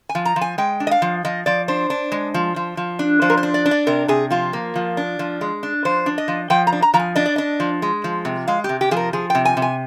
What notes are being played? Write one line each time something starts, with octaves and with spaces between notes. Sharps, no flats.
G#5
F3
A#5
F3
G#5
G#3 G5
D4
D#5
F5
F3
F3 D#5
F3 D5
D4 C5
D4
G#3
F3
F3
F3
D4
F3 C5
A#4
C5
D4
D5
D4
D5
C3 A#4
C3 G#4
F3 F4
A#3
F3
D4
F3
G#3
D4
F3 C5
D4
D#5
F3
F3 G5
A#5
D4
A#5
F3 A#5
G#5
D4 D#5
D5
D4 D#5
F3
G#3
F3
C3
G#3 F5
C3 G4
G4
F3 G#4
A#4
F3 G#4
C3 G5
G#5
C3
G#5